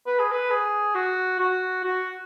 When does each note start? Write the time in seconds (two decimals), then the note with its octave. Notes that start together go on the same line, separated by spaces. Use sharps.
0.06 B4
0.19 G#4
0.32 B4
0.51 G#4
0.95 F#4
1.39 F#4
1.84 F#4